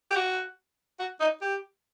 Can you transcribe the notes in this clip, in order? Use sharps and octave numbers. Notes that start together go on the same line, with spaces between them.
G4
F#4
F#4
D#4
G4